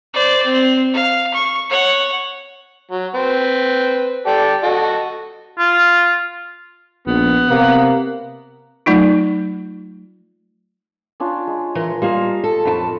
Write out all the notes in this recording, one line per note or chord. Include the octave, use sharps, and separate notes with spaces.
C5 D5
C4
F5
C#6
C#5 F#5
F#3
C4 B4
G4 A4 D5
F#4 A4 D#5
F4
A#1 B3
C3 A#3
F#3 A3 D#4 F4
C#4 D4 F4
G#3
E3 A#4
G3 A#3 F4 D#5 F5
A4
F2 F4 A5 B5 C#6